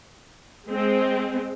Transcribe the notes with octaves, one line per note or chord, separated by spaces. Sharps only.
G#3 C4